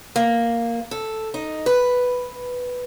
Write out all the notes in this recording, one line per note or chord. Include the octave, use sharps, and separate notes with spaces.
A#3
A4
D#4
B4